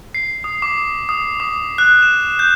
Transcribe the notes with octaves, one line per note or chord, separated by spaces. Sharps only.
C7
D#6
D6
D#6
D6
F#6
E7
G6